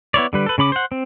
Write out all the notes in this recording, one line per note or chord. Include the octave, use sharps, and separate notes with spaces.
B3 E4 C#5 D5
D3 G3 B4
A4 B4
C#3 C#4 B5 D6
C5 F#5
C4